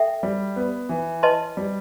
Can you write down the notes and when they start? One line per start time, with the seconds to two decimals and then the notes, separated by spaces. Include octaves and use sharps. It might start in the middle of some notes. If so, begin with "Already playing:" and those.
Already playing: A4 E5 G5
0.23 G3
0.56 B3
0.89 E3
1.23 B4 D#5 A5 C6
1.57 G3